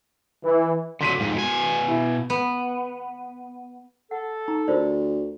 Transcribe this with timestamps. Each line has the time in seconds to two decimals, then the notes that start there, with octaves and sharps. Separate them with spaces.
0.44 E3
1.01 D3 F#3 C6 B6 D#7
1.18 F2 G#2
1.34 B2 G#5
1.88 E4
2.30 B3
4.11 A4 F#5
4.48 D#4 A#5
4.68 D2 F4 A#4 C5 D5